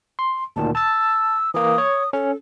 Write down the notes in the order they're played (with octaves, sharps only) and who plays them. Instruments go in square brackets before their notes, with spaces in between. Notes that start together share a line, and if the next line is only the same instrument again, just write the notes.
[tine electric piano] C6
[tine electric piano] D2 A#2 D#3 [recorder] A5
[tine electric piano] A5 A6 [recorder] E6
[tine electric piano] E3 A#3 [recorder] D#6
[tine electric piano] C#5
[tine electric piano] C#4 [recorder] A4